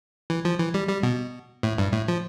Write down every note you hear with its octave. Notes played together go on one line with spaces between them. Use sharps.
E3
F3
E3
G3
G3
B2
A2
G2
A2
F3